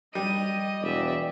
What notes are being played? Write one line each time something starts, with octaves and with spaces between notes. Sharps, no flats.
G3 D#5 D#7
E1 D5 E5